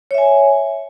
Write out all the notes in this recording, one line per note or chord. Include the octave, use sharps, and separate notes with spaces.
C#5 E5 G#5